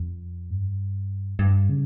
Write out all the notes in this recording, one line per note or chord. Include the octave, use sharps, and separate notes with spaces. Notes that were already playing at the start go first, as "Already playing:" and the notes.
Already playing: F2
G2
G2
C#3